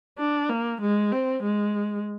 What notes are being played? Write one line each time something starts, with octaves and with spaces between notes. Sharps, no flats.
D4
A#3
G#3
C4
G#3